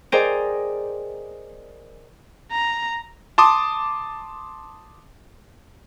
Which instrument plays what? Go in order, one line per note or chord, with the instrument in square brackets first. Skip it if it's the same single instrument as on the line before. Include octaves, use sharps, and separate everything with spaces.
[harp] G#4 A#4 C5 D5 D#5 G5
[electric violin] A#5
[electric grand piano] A5 C6 D6 D#6